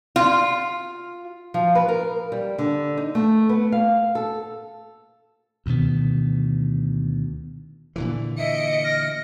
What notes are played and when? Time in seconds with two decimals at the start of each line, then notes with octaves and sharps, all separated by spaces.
0.16 F4
1.54 F3
1.75 B4
1.88 A#4
2.32 G3
2.59 D3
2.97 D#4
3.15 A3
3.49 B3
3.72 F5
4.15 A4
5.66 D2 B2 D#3 B3
7.96 A#2 D3 E3
8.38 D#5 E5 C#7 D7
8.84 F6 A#6